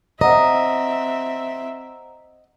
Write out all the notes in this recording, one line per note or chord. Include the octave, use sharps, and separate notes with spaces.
C4 C5 D#5 E5 F#5 A#5